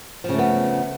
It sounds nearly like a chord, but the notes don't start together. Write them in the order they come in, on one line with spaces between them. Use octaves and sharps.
F3 C#3 A3 B3